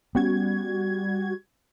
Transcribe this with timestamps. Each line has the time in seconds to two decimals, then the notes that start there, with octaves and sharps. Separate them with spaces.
0.15 G3 B3 C#4 F#4 G#6